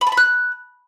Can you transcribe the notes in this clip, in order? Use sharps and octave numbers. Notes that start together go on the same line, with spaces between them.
B5
A5
B5
F#6